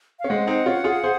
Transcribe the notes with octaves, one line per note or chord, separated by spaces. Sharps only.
F5
C#4
G#3 C4 F#5
C4 D#4
C#4 F4
F4 G#4
G#4 C5